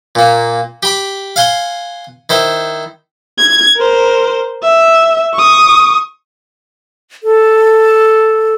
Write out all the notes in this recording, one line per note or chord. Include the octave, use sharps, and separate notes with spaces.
A#2 A#3
G4 B5 D6
F5 F#5 G#5 C6
D#3 E4 C5
G#6
A#4 C5
E5
C#6 D#6
A4